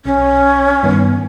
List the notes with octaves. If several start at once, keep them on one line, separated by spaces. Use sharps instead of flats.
B1 C#4
G2 D#3 B3